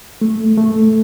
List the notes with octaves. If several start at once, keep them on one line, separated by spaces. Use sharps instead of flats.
A3
A3